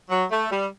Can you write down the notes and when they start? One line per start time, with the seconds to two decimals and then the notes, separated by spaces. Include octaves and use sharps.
0.10 F#3
0.31 A3
0.51 G3